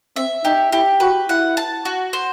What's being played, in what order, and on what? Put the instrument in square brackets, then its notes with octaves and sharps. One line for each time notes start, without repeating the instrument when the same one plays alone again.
[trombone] C4 [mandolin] E5
[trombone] D#4 [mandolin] G4
[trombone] E4 [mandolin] G4
[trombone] F#4 [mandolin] B4
[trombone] E4 [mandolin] F#5
[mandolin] A5
F#4
C5